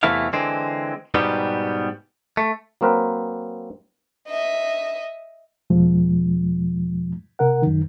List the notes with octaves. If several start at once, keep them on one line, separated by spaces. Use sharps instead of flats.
E2 C3 E3 A3 E4 F5
D3 E3 G#3 C4
G#2 B2 G3 B3 G4
A3
F#3 A#3 C4 A#4 B4
D#5 E5
E2 B2 F3 G#3
C3 A#4 F#5
F#2 D#3